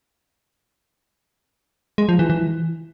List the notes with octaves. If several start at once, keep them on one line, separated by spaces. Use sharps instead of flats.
G#3
F3
E3
E3